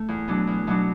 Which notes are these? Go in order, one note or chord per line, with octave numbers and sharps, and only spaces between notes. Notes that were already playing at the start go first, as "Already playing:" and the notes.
Already playing: A3
E2
B2 F#3 B3 D4
E2
B2 F#3 B3 D4